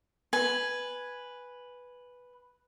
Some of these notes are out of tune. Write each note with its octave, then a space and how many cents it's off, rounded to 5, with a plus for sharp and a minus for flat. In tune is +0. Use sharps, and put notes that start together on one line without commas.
B4 +0 G#5 +0